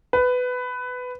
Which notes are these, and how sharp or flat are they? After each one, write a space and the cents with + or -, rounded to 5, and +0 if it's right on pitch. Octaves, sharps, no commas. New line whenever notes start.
B4 +15